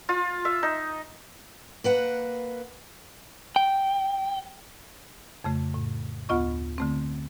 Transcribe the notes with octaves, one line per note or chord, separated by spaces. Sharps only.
F4
E5
D#4
A#3 B4 F#5
G5
F2 C#3 A3
A2
D2 B3 F4 D#5 C#6
D3 A3 C4